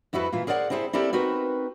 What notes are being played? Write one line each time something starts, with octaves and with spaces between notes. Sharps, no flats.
F2 E4 F#4 A4 B4
A#2 E3 F4
G#4 A#4 C5 D5 E5 F#5
C4 E4 G#4 A4 C5
C4 E4 G4 A4 A#4 D5
C4 D#4 F#4 A#4 B4